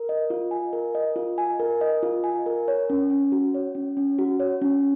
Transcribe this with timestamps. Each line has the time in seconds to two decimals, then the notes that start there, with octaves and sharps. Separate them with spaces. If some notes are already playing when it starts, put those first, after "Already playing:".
Already playing: A#4
0.09 D#5
0.30 F4
0.51 G#5
0.73 A#4
0.95 D#5
1.16 F4
1.38 G#5
1.59 A#4
1.81 D#5
2.03 F4
2.24 G#5
2.46 A#4
2.68 C#5
2.90 C#4
3.10 C#4
3.32 F#4
3.54 C#5
3.75 C#4
3.97 C#4
4.19 F#4
4.40 C#5
4.62 C#4